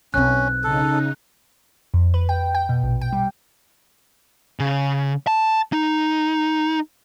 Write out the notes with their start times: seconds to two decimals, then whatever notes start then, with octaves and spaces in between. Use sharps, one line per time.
0.14 B1 C4 C#4 F#6
0.64 C#3 D#4 A4
1.94 F2
2.14 B4
2.29 G5
2.55 G5
2.69 B2
2.83 A#1
3.01 G5
3.13 G3
4.60 C#3
5.27 A5
5.72 D#4